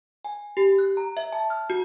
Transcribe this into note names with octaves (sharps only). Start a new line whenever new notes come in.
G#5
G4
F#6
A#5
E5
A5
F6
F#4